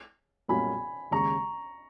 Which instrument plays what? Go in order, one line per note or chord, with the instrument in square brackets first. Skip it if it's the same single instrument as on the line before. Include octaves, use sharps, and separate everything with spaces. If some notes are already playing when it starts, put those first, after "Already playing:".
[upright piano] B1 A#2 G3 A#3 C#4 [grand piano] G#5 B5
[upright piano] D#2 C#3 G#3 [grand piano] A#5 C#6